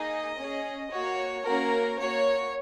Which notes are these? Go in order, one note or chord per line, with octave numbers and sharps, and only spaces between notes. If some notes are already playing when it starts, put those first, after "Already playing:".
Already playing: A#3 D#4 G#4 D#5
C#4 G#4
F#4 C#5
A#3
A#3 C#4 F#4 A#4
A#3 F#4 C#5